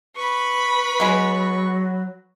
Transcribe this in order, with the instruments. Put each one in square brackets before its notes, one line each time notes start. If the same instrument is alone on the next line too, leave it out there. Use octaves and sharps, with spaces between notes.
[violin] B4 B5 [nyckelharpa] C#6
[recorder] F#3 [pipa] G#3 B3